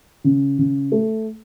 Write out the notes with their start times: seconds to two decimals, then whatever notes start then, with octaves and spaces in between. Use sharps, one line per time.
0.24 C#3
0.59 C#3
0.92 A3